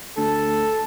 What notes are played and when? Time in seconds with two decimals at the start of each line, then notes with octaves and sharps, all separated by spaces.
0.17 D2 A4